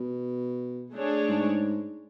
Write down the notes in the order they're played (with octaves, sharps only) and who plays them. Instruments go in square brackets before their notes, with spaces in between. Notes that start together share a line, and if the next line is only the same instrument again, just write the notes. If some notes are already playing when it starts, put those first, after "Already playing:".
Already playing: [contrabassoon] B2
[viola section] A3 D4 G#4 C#5
[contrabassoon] G#2